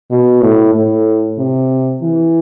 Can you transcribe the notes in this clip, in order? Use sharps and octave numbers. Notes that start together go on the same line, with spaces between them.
B2
A2
A2
C3
E3